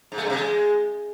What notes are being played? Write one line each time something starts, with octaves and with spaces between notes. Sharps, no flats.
G#2
A3
G2
C3
G#3